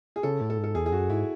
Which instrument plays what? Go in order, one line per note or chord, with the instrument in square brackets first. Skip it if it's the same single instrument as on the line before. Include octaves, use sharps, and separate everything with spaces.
[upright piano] G#4
[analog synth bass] C#3 [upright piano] A4
[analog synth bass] A2
[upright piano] A4
[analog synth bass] G#2
[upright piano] A4
[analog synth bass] E2 [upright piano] G#4
[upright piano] G#4
[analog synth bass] F#2 [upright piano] F#4
[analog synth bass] G#2 [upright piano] E4